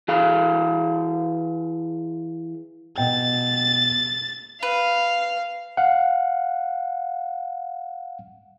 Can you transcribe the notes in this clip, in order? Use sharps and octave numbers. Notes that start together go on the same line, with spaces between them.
E3 G#4 F5
B2 G5 A6
B4 F5
F5 F#5